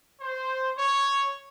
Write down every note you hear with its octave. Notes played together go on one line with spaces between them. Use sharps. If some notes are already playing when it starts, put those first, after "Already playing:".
C5
C#5